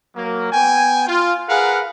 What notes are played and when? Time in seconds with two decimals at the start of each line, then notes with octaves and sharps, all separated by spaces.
0.15 F#3 A#3
0.51 B3 G5 G#5
1.07 F4
1.48 G#4 A#4 B4 F5 F#5